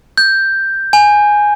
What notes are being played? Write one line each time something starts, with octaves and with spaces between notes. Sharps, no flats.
G6
G#5